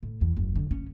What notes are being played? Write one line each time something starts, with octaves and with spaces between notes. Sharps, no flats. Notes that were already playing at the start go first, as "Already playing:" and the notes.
A2
E2
F#1
D3
C#4